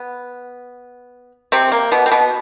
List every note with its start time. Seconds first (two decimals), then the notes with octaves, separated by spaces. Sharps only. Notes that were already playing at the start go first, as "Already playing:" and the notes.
Already playing: B3
1.52 C3 C4
1.72 A#3
1.92 B2 B3
2.06 C4
2.12 B2 B3